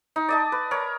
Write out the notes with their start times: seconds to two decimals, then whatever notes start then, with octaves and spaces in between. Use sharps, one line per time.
0.16 D#4
0.29 D5 D#5 A5
0.52 B4
0.71 A#4 C#5